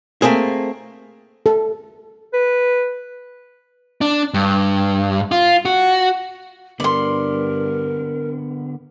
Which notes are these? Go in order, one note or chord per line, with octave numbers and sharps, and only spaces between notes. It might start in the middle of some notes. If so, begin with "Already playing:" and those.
A3 A#3 C4 G#4
A4
B4
D4
G2
F4
F#4
G2 D3 B3 A#4 D5 C6